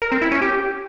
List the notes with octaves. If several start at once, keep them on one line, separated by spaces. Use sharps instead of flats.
A#4
C4
E4
C#4
G4